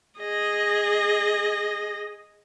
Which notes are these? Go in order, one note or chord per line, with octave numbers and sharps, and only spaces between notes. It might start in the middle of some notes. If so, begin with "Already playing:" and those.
G#4 D#5